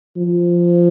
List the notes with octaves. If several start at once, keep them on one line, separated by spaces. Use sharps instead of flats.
F3